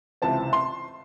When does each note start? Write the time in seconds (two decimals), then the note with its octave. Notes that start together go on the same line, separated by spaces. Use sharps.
0.22 C#2 C3 E3 C4 A5
0.53 C6